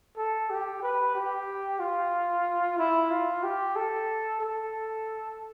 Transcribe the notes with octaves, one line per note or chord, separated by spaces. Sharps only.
A4
G4
B4
G4
F4
E4
F4
G4
A4
A4